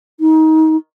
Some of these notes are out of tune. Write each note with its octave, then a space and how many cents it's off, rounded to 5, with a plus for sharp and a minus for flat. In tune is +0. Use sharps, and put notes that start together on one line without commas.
D#4 +25